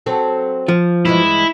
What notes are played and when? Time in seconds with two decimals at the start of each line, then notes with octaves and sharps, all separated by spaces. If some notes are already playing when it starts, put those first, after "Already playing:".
0.06 F#3 C4 A4
0.68 F3
1.05 G2 E3 G#3 E4